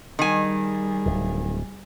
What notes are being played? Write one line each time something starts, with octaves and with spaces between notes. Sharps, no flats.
D#3 G3 G#4 G#5
D1